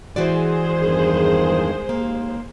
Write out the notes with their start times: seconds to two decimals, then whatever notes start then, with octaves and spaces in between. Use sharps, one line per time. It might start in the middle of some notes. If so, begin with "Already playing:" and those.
0.16 E3 G#3 F#4 G#4 C5 D5
0.77 E2 G2 D#3
1.89 D#2 A#3